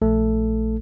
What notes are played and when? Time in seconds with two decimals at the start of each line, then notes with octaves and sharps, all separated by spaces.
0.02 A#1 A3 A4